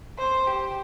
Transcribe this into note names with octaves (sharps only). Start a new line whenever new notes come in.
C5
G4